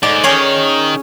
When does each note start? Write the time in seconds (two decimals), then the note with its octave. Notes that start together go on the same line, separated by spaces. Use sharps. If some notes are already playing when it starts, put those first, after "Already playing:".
0.03 G#2 D5
0.23 D#3 C#4 G#4 C#5